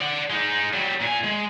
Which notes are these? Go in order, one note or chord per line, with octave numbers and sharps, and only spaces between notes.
D5 F#5
G#3 D#4
F#3 G3
A#2 G#5
G#3